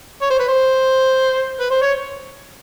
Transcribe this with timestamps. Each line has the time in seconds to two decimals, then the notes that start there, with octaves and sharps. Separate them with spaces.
0.22 C#5
0.30 C5
0.39 B4
0.48 C5
1.59 B4
1.70 C5
1.82 C#5